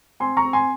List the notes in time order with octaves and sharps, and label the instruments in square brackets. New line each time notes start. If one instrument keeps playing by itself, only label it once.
[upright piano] C4 G#5 C6
A#5 C#6
C4
G#5 C6